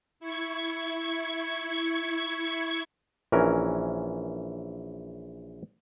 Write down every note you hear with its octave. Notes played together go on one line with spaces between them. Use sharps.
E4 C#6 G#6
A#1 E3 C#4 A#4